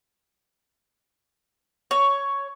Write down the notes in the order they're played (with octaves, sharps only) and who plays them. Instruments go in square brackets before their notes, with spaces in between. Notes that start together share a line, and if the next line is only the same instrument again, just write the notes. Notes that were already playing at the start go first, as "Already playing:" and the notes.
[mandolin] C#5